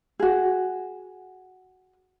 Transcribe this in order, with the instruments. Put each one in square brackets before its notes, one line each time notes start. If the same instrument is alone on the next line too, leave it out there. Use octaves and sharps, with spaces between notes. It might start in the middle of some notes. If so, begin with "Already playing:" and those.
[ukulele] F#4 G#4